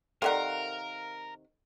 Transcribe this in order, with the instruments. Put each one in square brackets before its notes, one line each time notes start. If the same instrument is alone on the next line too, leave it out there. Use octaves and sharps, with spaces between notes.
[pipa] C3 D#3 F#5 [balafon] A4 D5 [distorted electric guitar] A#4 [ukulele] F5 A#5